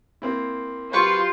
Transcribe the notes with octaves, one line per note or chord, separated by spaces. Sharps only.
A#3 C4 E4
F#3 F4 G4 B4 C5 C#6